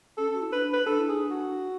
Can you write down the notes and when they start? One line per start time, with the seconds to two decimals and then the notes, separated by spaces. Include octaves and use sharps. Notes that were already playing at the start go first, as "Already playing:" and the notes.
0.18 C#4 A4
0.33 F#4
0.42 E4
0.52 D4 B4
0.73 B4
0.86 D4 A4
0.99 E4
1.09 D4 G#4
1.31 F#4